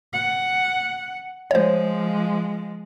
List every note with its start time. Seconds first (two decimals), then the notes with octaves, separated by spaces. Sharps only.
0.14 F#5
1.51 F3 G#3 C5 C#5